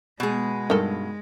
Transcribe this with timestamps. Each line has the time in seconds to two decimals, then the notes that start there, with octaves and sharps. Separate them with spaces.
0.20 B2 G#3 G#4
0.70 G2 D#3 A4